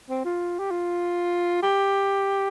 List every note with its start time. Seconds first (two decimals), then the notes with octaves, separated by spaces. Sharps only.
0.09 C4
0.25 F4
0.59 G4
0.70 F4
1.62 G4